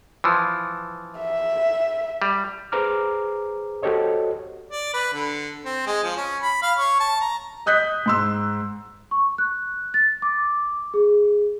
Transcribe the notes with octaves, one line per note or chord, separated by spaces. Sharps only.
E3 F3
E5
G3
G#4 B4 C5 A#5 D6 F6
F#4 G4 A4 C5 C#5 D#5
D5
B4
D3
C4
G#3
F3
C#4
B5
F5
C#5
A5
A#5
D#5 D#6 F#6 G6 B6
G#2 C6 E6
C#6
F#6
A6
D6
G#4